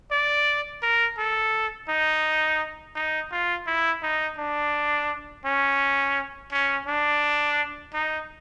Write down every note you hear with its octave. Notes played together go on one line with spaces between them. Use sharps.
D5
A#4
A4
D#4
D#4
F4
E4
D#4
D4
C#4
C#4
D4
D#4